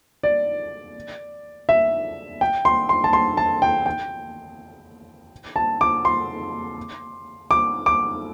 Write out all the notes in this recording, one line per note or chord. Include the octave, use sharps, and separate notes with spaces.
D5
E5
G5
C6
C6
A5
C6
A5
G5
G5
A5
D6
C6
D6
D6